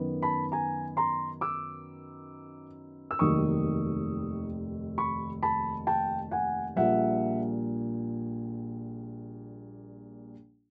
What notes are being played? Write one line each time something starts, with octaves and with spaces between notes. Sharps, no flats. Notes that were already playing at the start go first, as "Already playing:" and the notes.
Already playing: F#2 D#3 F#3 B3
A5 B5
G#5 A#5
A#5 C6
D6 E6
E6
F1 D#2 D#3 F#3 C#6 D#6
B5 C#6
A5 B5
G5 A5
F#5 G#5
A#1 A#2 G3 E5 F#5